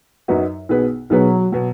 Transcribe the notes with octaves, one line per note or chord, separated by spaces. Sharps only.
F#2 F#3 D#4 F#4 B4
B1 B2 B3 G#4 B4
B1 B2 F#3 B3 G#4 B4
B2 F#3